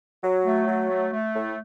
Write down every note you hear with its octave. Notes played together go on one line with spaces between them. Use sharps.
F#3
A3
F#3
A3
A3
A2